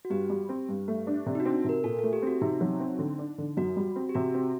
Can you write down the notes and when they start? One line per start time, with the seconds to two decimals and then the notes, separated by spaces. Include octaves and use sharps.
0.05 F#4
0.10 G2 G4
0.30 G3
0.49 C4
0.69 G2
0.88 A3
1.07 D4
1.26 C3
1.35 D#4
1.40 F#4
1.45 C4
1.64 C3 A#4
1.84 A#2 A4
1.99 A3 A4
2.13 G4
2.22 C4 F#4
2.41 C3 D#4
2.61 F#3
2.80 C4
2.99 D3
3.19 D4
3.38 D3
3.57 F#2 F#4
3.76 G3
3.96 C4
4.09 G4
4.15 C3 F#4
4.34 C4